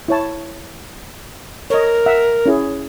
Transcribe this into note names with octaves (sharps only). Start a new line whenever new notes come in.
E4 C#5 A5
A#4 C#5 D#5
E5 F#5
C#4 E4 G#4